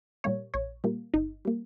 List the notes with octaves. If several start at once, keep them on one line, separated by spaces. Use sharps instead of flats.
A#2 G3 A#3 C#5
A#1 C#5
A#2 G3 A#3
G1 D#4
G3 A#3